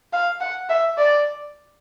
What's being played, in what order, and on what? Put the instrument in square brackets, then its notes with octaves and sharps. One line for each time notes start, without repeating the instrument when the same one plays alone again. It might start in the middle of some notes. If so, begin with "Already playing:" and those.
[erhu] F5
F#5
E5
D5